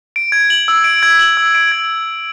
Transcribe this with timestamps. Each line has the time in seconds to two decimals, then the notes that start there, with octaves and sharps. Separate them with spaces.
0.16 D7
0.32 G#6
0.50 F#7
0.68 E6
0.84 D7
1.03 G#6
1.19 F#7
1.37 E6
1.55 D7
1.72 G#6